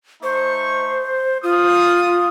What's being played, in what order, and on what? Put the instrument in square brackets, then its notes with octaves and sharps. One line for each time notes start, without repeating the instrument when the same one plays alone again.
[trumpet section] A3 D#4 C#6 [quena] C5
[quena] F4 [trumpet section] D#6